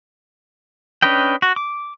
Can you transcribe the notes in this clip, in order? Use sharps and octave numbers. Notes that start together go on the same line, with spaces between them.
C#4 D4 B4 D#5 G5
F#4
D6